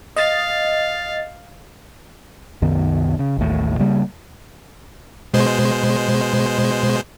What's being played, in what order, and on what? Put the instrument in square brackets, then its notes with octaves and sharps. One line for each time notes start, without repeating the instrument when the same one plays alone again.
[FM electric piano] D#5 A6 [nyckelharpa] F5
[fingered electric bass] C2 F#2 D#3 B3
C#3
A1 D#2 A2
C#3 G3 A#3
[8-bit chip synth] B2 G#3 C5